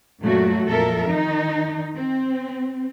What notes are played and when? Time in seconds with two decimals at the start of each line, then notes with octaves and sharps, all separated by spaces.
0.21 F#2 A#2 F#3 A3 F#4
0.67 F2 A#2 A4 A#4 E5
1.10 D#3 D#4
1.96 C4